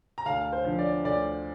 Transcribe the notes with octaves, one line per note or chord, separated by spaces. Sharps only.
A#5
D2 F5 A5
C5
D3 F3
D5
D2 D5